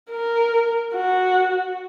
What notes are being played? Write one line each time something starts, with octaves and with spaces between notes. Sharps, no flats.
A#4
F#4